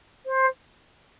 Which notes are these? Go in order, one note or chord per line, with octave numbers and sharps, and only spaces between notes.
C5